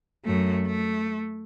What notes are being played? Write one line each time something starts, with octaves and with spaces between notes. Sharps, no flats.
F#2 A3
A3